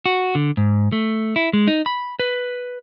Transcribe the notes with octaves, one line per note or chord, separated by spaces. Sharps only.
F#4
D3
G#2
A3
E4
G#3
D#4
B5
B4